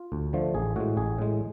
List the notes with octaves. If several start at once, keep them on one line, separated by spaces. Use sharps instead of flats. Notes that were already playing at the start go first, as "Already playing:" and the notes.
Already playing: F4
D2
D3 F3 A3
A1 G#4
A2 G#3 F#4
A1 G#4
A2 G#3